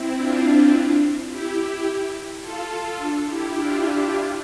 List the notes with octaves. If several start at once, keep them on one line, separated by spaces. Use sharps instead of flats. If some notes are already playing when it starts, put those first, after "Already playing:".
Already playing: C4 E4
D4 F4
E4 G4
F4 A4
F4 A4
D4 F4
E4 G4
D4 F4
D4 F4
D4 F4